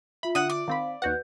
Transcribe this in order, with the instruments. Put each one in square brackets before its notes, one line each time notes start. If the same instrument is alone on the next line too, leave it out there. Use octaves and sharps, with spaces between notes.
[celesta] F4 E5 [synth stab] B5
[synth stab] D3 [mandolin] F#5 D#6
[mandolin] D5
[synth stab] D#3 C4 B5 [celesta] F5
[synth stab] D#2 F#4 F#5 [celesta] B4 G6